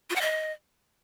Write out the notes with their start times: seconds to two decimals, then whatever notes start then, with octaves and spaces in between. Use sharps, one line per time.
0.10 F4
0.16 F#5
0.21 D#5